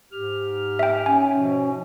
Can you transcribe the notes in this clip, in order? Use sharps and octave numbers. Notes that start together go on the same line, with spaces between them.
G#2 G4 F6
E5 G5
C#4 G#5
G#2 B2 F3